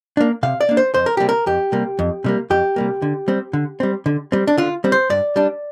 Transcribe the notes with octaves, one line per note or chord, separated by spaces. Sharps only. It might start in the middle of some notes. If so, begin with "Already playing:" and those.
A#3 D4
C3 F5
D5
A#3 D4
C5
F2 C5
A#4
C3 G3 A#3 G4
A#4
F2 G4
C3 G3 A#3
F2
C3 G3 A#3
F2 G4
C3 G3 A#3
D3
G3 C4
D3
G3 C4
D3
G3 C4
D4
D3 F4
G3 C4
C5
G2 D5
G3 D4